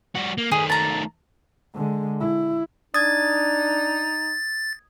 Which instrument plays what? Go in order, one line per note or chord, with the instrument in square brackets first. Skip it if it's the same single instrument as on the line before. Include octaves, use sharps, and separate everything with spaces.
[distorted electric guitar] G3 F#4
A#3
[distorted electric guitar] D#3 A3 [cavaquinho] G#4
[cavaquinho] A5 A#5
[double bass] D3 G#3
E4
[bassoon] D4 [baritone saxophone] D#4 [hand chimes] D#6 G#6 [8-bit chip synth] A6